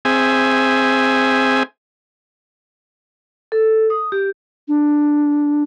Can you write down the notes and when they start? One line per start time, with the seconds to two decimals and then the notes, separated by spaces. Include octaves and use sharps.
0.05 C4 G#4 E5 G#5
3.52 A4
3.90 D#6
4.12 G4
4.68 D4